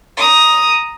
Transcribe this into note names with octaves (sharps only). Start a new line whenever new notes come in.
A#5 D#6